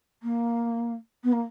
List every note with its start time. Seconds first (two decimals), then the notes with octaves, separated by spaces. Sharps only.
0.23 A#3
1.23 B3
1.32 A#3